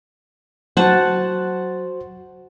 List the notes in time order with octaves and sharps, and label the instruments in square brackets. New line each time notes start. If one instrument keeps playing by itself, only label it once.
[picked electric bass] F#3 [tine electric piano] F#4 C5 [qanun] F#5 A5